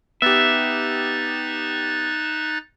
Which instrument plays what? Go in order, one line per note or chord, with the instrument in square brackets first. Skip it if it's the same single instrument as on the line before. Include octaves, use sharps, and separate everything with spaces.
[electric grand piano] B3 G4 [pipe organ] D#4 F#6 A6 [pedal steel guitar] E5